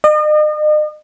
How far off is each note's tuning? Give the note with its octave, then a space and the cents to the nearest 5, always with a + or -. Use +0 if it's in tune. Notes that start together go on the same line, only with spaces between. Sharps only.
D#5 -40